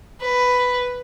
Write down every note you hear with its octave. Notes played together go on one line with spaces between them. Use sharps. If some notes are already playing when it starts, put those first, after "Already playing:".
B4